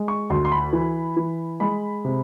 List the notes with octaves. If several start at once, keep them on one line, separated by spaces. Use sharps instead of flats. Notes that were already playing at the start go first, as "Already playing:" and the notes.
Already playing: G#3
C#6
D2 C6
C6
B5
E3
E3
G#3 B5
C3